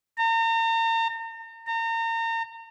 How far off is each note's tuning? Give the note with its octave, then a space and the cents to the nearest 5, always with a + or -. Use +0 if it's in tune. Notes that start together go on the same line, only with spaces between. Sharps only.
A#5 -40
A#5 -35